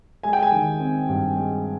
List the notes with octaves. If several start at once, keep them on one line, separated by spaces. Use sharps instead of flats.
G#3 G#5
G5
G#5
D#3
C4
G2
G#3